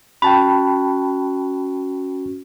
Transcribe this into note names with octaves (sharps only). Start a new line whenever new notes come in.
C#4 F#4 G5 A5 B5